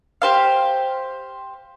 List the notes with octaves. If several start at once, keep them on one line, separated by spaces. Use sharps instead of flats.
G4 C5 F5